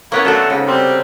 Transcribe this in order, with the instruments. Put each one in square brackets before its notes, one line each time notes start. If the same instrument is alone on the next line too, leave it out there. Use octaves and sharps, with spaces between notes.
[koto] A#3 B3 C#4 [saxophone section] E4 B4 C#5
[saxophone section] D3 F#3 A3 [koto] F#4 A4
[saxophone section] G#2 [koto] C#3
[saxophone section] C3 G3 C4